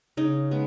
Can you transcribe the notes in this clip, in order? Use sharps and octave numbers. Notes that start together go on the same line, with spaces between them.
C#3 D#4
G#3 B3